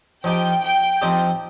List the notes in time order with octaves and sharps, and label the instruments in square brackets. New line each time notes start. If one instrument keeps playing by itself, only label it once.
[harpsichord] F3 D#4 G4 [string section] G5
[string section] G5
[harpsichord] F3 C4 D#4 G4